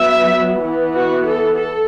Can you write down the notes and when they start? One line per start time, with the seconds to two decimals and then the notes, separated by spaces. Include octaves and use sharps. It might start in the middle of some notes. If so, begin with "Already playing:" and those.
Already playing: F#3 B3 E5
0.64 E3 B3
0.95 F#4
1.27 A4
1.57 A4